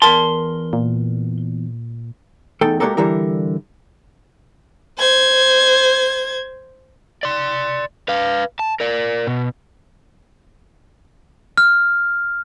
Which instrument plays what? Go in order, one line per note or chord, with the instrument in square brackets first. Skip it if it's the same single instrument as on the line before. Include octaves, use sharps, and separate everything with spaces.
[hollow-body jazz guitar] E2 A5 [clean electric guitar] A#4 C6
[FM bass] A#2
[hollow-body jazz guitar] E2 A3 D#4 A4 G5
G#3 A#3 F#4 G4 A4 A#4
D3 E3 G3 E4 A#4
[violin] C5 G#6
[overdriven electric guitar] D5 C6
B4 F5
A5
A#4 D5
B2
[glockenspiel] F6